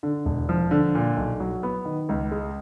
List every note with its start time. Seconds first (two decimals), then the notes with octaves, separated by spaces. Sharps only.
0.03 D3
0.25 E1
0.49 F3
0.71 D3
0.95 A#2
1.17 B1
1.40 F#3
1.63 B3
1.85 D#3
2.09 C#2
2.31 G#3